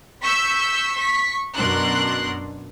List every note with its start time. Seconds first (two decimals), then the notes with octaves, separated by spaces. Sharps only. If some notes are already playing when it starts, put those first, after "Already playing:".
0.23 C#6 E6 G6 B6
0.94 C#6 B6
1.56 F#2 B2 D4 A#4 C6 F#6